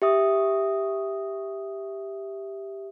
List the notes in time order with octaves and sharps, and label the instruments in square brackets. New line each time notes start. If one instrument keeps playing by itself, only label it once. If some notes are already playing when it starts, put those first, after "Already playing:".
[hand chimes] G4 E5 D#6